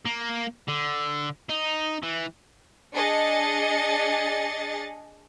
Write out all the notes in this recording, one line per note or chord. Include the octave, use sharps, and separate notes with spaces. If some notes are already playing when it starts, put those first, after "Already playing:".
A#3
D3
D#4
E3
D4 G#4 D#5 A6 C#7